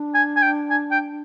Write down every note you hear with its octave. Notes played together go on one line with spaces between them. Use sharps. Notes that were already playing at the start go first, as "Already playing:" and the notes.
Already playing: D4
G#5
G#5
G5
G#5
G5